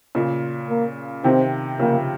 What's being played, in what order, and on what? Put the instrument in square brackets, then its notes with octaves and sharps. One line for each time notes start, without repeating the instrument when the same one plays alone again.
[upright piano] A#2 C#3
[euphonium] A#3
[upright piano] C3 D#3 [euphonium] C4
[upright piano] C#3 F3 [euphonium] A#3